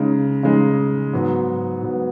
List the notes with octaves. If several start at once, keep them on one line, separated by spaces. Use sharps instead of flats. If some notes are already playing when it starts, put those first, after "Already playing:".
Already playing: C#3 G#3 D#4
C#3 G#3 D#4
G#2 F#3 B3
G#2 F#3 B3